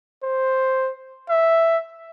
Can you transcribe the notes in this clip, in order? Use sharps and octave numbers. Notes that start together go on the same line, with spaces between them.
C5
E5